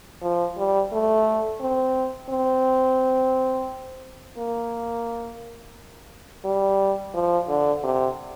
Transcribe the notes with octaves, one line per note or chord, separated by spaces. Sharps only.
F3
G3
A3
C4
C4
A#3
G3
F3
D3
C3